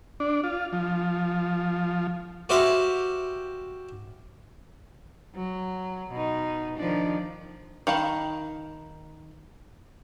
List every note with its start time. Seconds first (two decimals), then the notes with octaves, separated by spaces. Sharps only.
0.20 D4
0.44 F4
0.73 F3
2.49 F#4 G4 C5 E5 F5
5.35 F#3
6.12 B2 D#4
6.77 D#3 F3 D4
7.87 D#3 F5 A5 B5